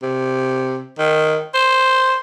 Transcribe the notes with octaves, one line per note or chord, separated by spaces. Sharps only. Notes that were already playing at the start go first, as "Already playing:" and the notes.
C3
D#3
C5